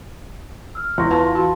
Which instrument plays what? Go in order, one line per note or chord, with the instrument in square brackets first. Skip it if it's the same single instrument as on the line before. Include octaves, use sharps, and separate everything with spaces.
[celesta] E6 F6
[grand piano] E2 [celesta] C6 C#6 A#6
[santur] F4 [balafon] B4 A5
[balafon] F#4 [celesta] A5 B5